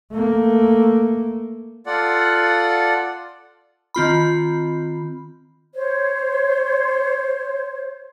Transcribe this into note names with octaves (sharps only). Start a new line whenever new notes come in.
A3 A#3
F4 A4 D5 F#5
D#3 C4 F4 B5
C5 C#5